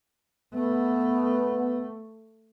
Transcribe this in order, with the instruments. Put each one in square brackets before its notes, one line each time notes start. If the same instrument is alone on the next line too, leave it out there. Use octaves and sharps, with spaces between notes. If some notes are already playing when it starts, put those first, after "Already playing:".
[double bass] A3 [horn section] B3